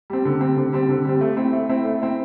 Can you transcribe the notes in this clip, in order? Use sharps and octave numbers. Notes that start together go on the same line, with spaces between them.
G3 C4
D3
G3 C4
D3
G3 C4
D3
G3 C4
A3
C4 E4
A3
C4 E4
A3
C4 E4